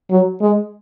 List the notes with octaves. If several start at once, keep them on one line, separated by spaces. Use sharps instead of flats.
F#3
G#3